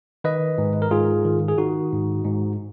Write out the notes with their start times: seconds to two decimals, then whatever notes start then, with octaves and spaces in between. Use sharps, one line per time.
0.24 D#3 B4 D#5
0.58 G#2
0.82 A#4
0.91 G#2 F4 G#4
1.25 D#3
1.48 G#4
1.58 D#3 D#4 F#4
1.92 G#2
2.25 G#2